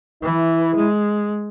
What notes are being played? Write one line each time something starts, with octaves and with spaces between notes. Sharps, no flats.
E3 E4
G#3